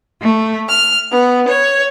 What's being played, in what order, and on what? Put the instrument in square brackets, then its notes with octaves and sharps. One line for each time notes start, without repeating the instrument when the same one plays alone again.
[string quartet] A3
F6
B3
C#5